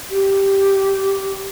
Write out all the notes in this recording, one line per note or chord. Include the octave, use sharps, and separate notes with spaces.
G4